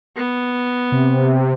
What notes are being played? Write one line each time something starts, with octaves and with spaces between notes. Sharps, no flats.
B3
C3